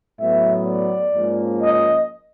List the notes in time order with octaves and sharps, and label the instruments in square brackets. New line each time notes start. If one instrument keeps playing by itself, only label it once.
[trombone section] A2 F#3 B3 [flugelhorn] E5
[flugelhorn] D5
[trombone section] G#2 F3 A#3 C#4
[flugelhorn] D#5